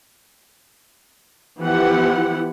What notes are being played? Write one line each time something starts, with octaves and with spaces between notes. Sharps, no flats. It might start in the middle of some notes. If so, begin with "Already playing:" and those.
E3 F3 B3 E4 G4 F#5